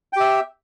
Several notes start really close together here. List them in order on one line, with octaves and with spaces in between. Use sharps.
G5 G4 E5